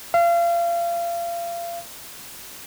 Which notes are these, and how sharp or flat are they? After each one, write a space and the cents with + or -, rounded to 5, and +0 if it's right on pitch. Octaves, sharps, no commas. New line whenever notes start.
F5 -30